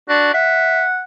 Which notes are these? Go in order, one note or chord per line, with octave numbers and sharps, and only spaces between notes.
D4 F#4
E5 F#5